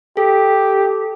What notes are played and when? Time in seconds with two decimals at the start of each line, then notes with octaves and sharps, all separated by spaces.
0.17 G4 A4